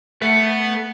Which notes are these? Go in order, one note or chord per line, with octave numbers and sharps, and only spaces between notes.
A3 B4 F#5